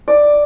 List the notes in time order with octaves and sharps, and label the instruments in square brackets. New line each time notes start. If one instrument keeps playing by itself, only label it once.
[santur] D5